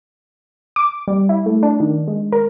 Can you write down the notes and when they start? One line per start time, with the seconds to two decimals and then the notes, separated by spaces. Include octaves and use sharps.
0.76 D6
1.07 G3
1.29 E4
1.46 A3
1.63 D4
1.80 D#3
2.07 G#3
2.32 A#4